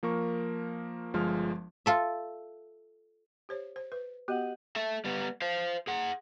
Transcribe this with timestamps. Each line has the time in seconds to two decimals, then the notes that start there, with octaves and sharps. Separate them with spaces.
0.03 F3 A#3 A#4 C#6
1.13 G1 F3 G#3 F6
1.86 F4 A4 E5
3.49 G4 C5 C#5
3.76 C5
3.92 B4
4.28 B3 F#4 G4 D#5 F#5
4.76 A4 E5
5.05 G3 B3
5.42 C5 F5
5.87 G#4 F#5